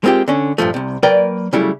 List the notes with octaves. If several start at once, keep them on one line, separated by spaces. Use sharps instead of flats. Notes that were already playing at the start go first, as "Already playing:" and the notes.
G#3 A#3 C4 F4 G4
D3 C#4
G2 A#2 F3 A3
C2 C3
F#3 A#3 A#4 B4 D5 G5
C#3 F#3 G3 A3 E4